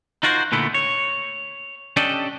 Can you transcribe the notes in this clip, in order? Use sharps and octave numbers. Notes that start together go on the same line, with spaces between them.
D#4 F4 F#4 A#4 C5
A#2 D3 A3 B3 E4
C#5
C#4 D4 G4 A4 D5 D#5